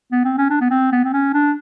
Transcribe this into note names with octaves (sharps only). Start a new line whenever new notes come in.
B3
C4
C#4
D4
B3
C4
B3
C4
C#4
D4